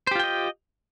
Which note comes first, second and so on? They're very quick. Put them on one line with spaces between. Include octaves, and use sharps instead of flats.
C5 G4 F4 G5 D#5